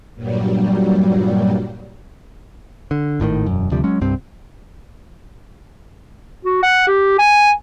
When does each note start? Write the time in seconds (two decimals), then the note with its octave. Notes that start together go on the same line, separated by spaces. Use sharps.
0.15 G2 A#2 F#3 G3
2.91 D3
3.20 G#1 A2 C3 D#3
3.46 E1 F#2
3.71 D2 C3 F3 G3
3.84 F#3 G#3 C#4
4.01 C2 G2 C4
6.45 F#4
6.63 F#5
6.87 G4
7.19 G#5